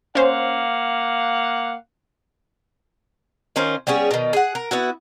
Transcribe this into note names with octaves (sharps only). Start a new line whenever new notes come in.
A#3 C#4 C5 F5 F#5
D#3 C#4 F4 C5
G3 B3 C#4 G#4
B2 D#3
G#4 F#5
A#4
B3 E4 F#4